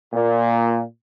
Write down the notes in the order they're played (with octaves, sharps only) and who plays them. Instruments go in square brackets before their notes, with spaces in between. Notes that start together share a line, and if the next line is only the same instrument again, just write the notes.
[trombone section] A#2